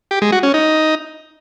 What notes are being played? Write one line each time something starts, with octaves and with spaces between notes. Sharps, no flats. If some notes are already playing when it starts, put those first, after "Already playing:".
G4
G#3
F#4
C#4
D#4